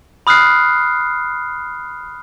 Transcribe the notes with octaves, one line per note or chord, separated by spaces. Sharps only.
B5 D#6 F6 F#6 C7